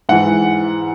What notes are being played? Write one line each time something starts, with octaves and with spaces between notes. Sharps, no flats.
G#2 E3 F#5